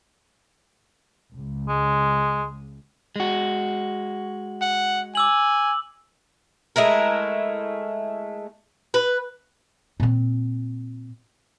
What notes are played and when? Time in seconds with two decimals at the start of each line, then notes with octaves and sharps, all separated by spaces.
1.32 C#2
1.69 G#3
3.16 G#3 F#4
4.62 F#5
5.15 G#5 D6 E6 F#7
6.76 G#3 A3 E4 A#4
8.94 B4
10.00 A#2 C4